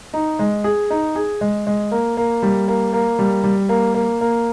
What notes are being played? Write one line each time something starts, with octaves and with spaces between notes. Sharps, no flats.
D#4
G#3
G#4
D#4
G#4
G#3
G#3
A#3
A#3
G3
A#3
A#3
G3
G3
A#3
A#3
A#3